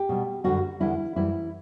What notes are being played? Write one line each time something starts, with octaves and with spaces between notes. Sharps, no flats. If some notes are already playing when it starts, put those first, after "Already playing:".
Already playing: G4
B2 G3
F#2 D3 G3 F#4
E2 D3 G3 E4
F#2 E3 G3 E4